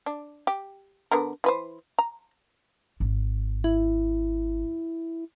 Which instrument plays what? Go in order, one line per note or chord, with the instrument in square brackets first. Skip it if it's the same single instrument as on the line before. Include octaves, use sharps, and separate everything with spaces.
[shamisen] D4
G4
D3 B3 A#4
E3 B4 C5
A#5
[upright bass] G#1
[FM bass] E4